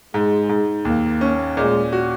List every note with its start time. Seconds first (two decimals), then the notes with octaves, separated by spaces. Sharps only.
0.14 G#2 G#3
0.49 G#2
0.85 D#2 A#3
1.21 C#4
1.57 A#2 G#3
1.93 F#4